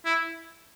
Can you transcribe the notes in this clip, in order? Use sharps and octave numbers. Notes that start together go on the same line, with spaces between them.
E4